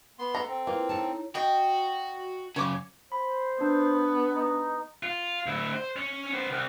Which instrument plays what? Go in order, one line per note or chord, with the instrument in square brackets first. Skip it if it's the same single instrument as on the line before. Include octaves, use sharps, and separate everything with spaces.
[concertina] B3 C6
[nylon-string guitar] A4 [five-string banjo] A#5
[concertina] C4
[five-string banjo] A#3 [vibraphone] E4 B4 [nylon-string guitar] F4
[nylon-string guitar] D#4 A4 A5 [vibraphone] E4 C#5 A#5
[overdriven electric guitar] F#4 [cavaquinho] D#5 G5
[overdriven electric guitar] F#2 C#3 [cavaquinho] C#5 D6
[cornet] C5 [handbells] B5
[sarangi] B3 [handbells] D4
[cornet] D#4
[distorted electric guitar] F4
D2 E4
C5
C#4 C#5
B3 C5
C2